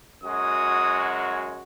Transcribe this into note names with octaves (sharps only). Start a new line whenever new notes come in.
F#2 G#3 F#4 D#6